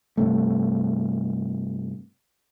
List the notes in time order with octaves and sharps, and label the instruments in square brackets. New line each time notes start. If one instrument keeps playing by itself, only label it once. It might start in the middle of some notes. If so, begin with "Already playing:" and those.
[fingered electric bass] G2 C3 A3